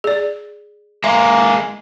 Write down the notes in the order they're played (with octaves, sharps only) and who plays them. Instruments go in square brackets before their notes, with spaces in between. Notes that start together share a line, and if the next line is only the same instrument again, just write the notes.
[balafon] G#4 D5
[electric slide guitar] G#3 A#3 [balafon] E5